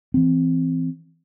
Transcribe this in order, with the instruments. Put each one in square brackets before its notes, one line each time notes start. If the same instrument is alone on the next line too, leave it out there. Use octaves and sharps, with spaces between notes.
[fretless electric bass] E3 C4